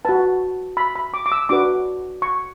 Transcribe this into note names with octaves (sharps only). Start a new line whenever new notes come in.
F#4 B4 A5
B5
B5
D6
D6
E6
D4 F#4 B4 D6
C#6